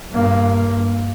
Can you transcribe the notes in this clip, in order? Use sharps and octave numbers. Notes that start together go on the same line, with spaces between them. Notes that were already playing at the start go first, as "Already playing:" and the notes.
G2 A#3